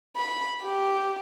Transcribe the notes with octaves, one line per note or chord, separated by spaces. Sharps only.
B5
G4